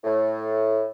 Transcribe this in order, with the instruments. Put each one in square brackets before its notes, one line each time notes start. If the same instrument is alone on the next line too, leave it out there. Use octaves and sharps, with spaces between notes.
[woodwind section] A2